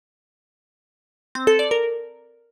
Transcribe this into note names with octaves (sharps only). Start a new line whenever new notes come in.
C4
A4
D5
A#4